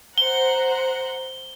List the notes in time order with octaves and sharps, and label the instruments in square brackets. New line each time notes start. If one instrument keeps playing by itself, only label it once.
[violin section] C5 F#5 A#5 [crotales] G7